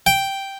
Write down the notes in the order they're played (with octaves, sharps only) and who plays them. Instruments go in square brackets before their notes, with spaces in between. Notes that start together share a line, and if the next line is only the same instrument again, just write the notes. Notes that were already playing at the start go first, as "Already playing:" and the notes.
[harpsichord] G5